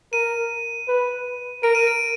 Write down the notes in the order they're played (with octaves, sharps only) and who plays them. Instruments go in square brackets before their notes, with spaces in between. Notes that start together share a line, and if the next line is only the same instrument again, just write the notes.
[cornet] A#4 [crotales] D#7
[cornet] B4
[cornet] A#4 [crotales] D7
[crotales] D#7
D7